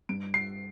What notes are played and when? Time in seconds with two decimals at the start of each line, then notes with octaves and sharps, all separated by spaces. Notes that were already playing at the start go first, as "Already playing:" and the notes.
0.09 G2 D7
0.34 C7